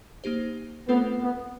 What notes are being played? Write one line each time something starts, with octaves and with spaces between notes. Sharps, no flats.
A#3 D#4 G4 C5
A3 B3 C4 F4 A4 C5
B3